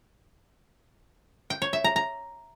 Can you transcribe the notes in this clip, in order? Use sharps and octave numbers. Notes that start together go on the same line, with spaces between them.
G5
C#5
E5
A#5
A#5